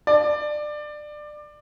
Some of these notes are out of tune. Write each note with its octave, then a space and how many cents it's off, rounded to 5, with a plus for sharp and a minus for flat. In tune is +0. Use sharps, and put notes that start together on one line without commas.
D5 +20